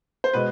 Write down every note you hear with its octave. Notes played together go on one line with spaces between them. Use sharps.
C5
B2 G#3 B4